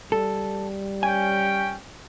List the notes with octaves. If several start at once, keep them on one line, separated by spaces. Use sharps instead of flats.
G3 A4
C#4 G5 G#5